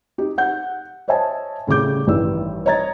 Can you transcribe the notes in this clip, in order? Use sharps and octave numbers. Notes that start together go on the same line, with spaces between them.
D#4 G4
F#5 G6
C5 C#5 D#5 E5 G#5 A5
A2 C#3 G3 D6 G6
A1 G2 D#3 E3 E6
C#5 D#5 A#5 G#6 A6